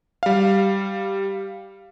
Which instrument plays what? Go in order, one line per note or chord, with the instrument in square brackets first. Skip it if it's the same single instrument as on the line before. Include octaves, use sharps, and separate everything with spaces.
[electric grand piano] G3 F5